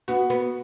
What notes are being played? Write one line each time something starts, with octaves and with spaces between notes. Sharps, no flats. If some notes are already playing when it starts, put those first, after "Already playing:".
B3 F#4
B3